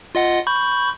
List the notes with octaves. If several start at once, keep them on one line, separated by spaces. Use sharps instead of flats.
F4 D#5 F#5
B5 C#6 G6